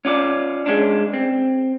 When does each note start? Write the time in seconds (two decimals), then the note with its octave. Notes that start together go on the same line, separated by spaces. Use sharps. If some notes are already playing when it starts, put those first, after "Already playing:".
0.05 C#4 F4 D5
0.66 G#3 C#4 D4
1.14 C4